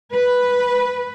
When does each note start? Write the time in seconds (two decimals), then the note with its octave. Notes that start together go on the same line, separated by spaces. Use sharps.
0.14 B4